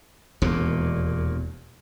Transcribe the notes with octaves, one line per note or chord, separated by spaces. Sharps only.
E1 D#2 A#2